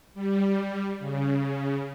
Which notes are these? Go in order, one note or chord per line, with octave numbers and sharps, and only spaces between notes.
G3
C#3